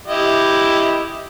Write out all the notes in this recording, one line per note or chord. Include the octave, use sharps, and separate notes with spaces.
E4 G4 D#5